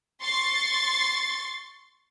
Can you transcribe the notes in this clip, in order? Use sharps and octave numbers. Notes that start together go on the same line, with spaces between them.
C6 C#6 A6 C7